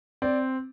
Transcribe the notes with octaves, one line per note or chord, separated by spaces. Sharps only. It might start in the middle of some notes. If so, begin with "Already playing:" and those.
C4 D5